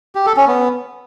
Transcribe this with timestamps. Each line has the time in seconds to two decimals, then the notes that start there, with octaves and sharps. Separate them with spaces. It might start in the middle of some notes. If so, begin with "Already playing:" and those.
0.15 G4
0.26 A4
0.37 C#4
0.47 B3